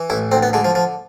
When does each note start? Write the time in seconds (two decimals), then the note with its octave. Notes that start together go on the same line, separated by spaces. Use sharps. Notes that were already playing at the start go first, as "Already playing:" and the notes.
Already playing: E3
0.10 A1 E4
0.32 D2 C4
0.43 B3
0.53 D3 G#3
0.65 F3
0.75 F3